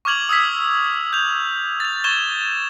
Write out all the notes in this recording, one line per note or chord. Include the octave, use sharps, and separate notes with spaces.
C#6 D6 F6 G#6 F7 F#7
D#6 E6 G#6 B6
G6 F7
A6 F7
C#6 G#6 E7 G7